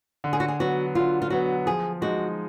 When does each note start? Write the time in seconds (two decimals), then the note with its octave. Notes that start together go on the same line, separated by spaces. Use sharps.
0.24 D3
0.33 G#4
0.40 F#4
0.48 G#4
0.60 F#3 B3 F#4
0.95 D3 F4
1.22 F4
1.30 F#3 B3 F#4
1.66 F3 G#4
2.01 G#3 D#4 F#4